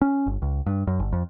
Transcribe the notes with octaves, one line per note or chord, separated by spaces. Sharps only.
C#4
G1
C#2
G2
F#2
G1
F2